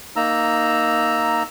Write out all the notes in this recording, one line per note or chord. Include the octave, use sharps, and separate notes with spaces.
A#3 D#4 A#5 E6